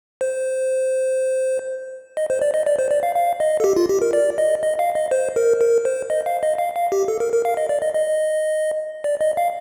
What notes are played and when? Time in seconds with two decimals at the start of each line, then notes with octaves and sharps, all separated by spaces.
0.21 C5
2.17 D#5
2.30 C5
2.42 D5
2.54 D#5
2.66 D5
2.79 C5
2.91 D5
3.03 F5
3.15 F5
3.40 D#5
3.60 A4
3.64 G4
3.76 F4
3.89 G4
4.02 A#4
4.13 D5
4.38 D#5
4.63 D#5
4.79 F5
4.95 D#5
5.11 C5
5.36 A#4
5.61 A#4
5.85 C5
6.10 D#5
6.26 F5
6.43 D#5
6.58 F5
6.76 F5
6.92 G4
7.08 A4
7.20 A#4
7.33 A#4
7.45 F5
7.57 D#5
7.69 D5
7.82 D#5
7.94 D#5
9.04 D5
9.21 D#5
9.37 F5